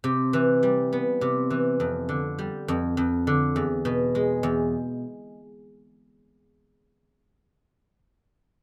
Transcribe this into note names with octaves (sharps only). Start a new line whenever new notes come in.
C3
E3
G3
B3
C3
E3
F2
D3
G3
F2
F2
D3
E2
B2
G#3
E2